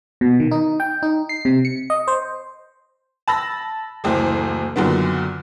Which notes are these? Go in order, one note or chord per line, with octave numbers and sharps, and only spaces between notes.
B2
D#3
D#4
G5
D#4
C7
C3
C#7
D#5
C5
A5 B5 E6 A#6
F#1 D2 E3 C5
F#2 A#2 D3 D#3 B3